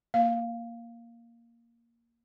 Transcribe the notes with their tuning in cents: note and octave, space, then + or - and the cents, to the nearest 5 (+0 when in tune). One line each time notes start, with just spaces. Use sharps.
A#3 +0 F5 +0